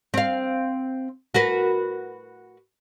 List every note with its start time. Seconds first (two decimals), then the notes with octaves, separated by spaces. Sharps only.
0.14 C4 F5
1.34 F#4 A#4 B4